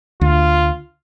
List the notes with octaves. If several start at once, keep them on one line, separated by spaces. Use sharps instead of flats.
D2 F4